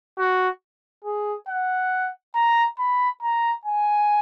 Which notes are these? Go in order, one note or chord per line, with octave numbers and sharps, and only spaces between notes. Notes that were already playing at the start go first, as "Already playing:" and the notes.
F#4
G#4
F#5
A#5
B5
A#5
G#5